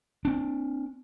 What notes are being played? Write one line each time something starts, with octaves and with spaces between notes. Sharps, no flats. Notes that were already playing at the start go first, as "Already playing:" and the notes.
C4 D4